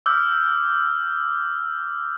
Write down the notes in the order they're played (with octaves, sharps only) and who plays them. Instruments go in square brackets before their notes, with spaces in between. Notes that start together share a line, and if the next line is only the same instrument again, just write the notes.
[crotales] D6 E6 F6 G6